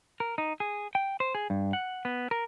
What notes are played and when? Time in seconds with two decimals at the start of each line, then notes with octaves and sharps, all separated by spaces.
0.20 A#4
0.38 D#4
0.60 G#4
0.95 G5
1.20 C5
1.35 G#4
1.50 G2
1.73 F#5
2.05 B3
2.31 A#4